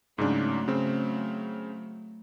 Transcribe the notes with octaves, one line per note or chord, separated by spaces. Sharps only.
G#2 C#3 F#3 A3 D4
C#3 C4